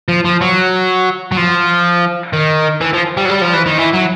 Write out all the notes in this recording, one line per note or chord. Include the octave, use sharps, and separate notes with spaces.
F3
F3
F#3
F#3
F3
D#3
E3
F3
G3
F#3
G3
F3
E3
D#3
E3
F#3